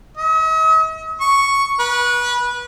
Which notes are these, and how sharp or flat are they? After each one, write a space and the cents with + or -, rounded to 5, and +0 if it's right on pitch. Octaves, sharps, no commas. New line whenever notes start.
D#5 +45
C#6 +0
B4 -25